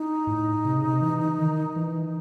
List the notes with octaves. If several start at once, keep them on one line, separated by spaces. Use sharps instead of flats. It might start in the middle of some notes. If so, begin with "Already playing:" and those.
Already playing: D#4
A2
C3
C#3
C3
E3
D#3
E3